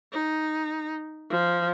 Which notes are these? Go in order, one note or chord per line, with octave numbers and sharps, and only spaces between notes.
D#4
F3